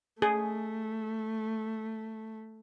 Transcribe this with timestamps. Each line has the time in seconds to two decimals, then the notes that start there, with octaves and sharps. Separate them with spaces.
0.22 A3 G#4